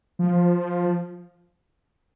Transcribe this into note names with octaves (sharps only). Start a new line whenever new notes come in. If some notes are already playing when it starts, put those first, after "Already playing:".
F3